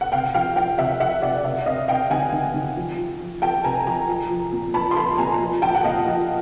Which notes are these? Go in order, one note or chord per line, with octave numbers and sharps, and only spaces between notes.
F#5
C3 F5 G5
F3 F5 G5
F3 F5 G5
C3 E5 F#5
F3 E5 F#5
C3 D5 E5
C3 D5 E5
C3 D#5 F5
C3 F5 G5
D#3 F#5 G#5
D#3
D#3
F3
F3
F3
F3 G5 A5
C3 G#5 A#5
F3 G#5 A#5
F3
F3
A#2
F3 A5 B5
C6
F3 A5 B5
A#2 G#5 A#5
F3
F3 G5 A5
F#5
A#2 D#5 F5
F3